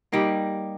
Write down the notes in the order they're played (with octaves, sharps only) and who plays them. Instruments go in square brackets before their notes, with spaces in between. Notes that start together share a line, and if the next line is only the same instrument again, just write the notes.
[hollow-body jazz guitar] G3 A#3 D#4 G4